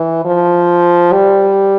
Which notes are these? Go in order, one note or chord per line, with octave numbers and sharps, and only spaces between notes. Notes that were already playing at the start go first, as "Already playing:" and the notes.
Already playing: E3
F3
G3